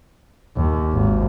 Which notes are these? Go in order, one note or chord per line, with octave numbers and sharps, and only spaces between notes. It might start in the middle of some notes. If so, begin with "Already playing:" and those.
D#2
G#1